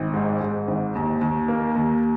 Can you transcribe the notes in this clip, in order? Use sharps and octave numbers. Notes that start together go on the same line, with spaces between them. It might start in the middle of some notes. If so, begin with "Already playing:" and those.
Already playing: G#1
G#2
G#2
G#1
D#2
D#2
A#3
D#2